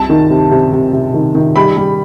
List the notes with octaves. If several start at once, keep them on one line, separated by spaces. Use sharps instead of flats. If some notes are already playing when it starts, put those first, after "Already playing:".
Already playing: C2 A5
D#3
C3
C3
C3
C3
D#3
D#3
G3 B5
G3